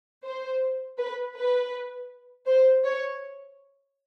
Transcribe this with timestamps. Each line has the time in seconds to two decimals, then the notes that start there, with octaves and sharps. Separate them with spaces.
0.24 C5
0.98 B4
1.35 B4
2.47 C5
2.84 C#5